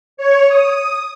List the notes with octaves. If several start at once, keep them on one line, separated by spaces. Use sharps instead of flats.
C#5
D#6